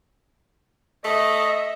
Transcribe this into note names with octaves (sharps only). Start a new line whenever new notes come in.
A3 D#5 E5